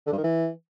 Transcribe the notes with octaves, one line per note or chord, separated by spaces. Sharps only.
D3
G2
D#3
E3